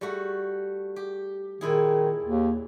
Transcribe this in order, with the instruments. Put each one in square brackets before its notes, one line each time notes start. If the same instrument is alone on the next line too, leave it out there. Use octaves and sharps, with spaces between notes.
[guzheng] G3 A3 F#4
G4
[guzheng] A#2 E4 G#4 [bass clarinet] D#3
[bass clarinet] D#2